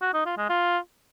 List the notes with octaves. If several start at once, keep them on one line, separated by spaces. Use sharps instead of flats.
F#4
D#4
F4
G#3
F4